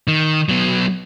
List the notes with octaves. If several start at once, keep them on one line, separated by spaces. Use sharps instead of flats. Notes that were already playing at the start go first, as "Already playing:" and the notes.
D#3
F#3 B3